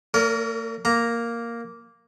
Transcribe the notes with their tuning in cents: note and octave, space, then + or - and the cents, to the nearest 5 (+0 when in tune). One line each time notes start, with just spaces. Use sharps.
A#3 -45 A#4 +0 D5 -45
A#3 +0 A#5 +0